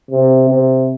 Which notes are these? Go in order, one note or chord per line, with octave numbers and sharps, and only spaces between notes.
C3
C3